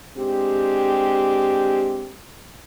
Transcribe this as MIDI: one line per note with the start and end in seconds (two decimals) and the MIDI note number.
0.18 2.15 56
0.18 2.15 60
0.18 2.15 62
0.18 2.15 67